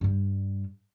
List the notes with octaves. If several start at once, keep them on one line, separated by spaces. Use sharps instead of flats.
G2 G3